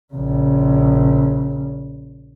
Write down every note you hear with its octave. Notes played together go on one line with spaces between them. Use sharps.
A#1 C#3